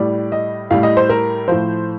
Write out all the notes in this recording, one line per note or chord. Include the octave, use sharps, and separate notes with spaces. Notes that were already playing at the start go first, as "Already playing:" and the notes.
Already playing: A2 G3 D5
D#5
A2 G3 F5
D#5
C5
A#4
A2 F3 C5